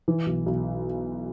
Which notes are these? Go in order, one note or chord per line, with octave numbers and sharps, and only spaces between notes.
E3
B1
B1